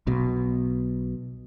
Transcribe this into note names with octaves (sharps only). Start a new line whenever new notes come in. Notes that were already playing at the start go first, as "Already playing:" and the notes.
B1 B2